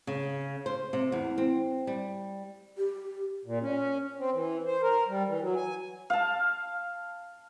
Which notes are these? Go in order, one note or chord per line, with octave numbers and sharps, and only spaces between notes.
C#3
C5
C3
E2
C4
G3
G4
A#2
C#4
C4
E3
C5
A#4
G3
E3
F#3
G#5
F5 A5